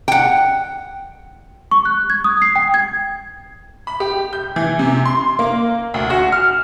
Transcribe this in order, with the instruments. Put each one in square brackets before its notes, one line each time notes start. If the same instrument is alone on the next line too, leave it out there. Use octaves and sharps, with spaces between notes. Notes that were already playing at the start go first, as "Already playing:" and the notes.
[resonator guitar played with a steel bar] F#5 G5
[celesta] C#6
F#6
G#6
D#6
C7
G5
G#6
[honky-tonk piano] B5
G4
G6
E3
C3
C6
A#3
D2
F#4
F6